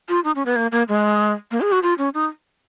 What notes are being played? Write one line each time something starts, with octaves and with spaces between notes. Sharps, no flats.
F4
D#4
C#4
B3
A#3
A#3
G#3
A#3
G#4
F#4
F4
C#4
D#4